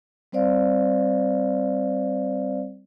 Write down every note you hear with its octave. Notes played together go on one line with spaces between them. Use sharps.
G3 C4 C5 D5 F5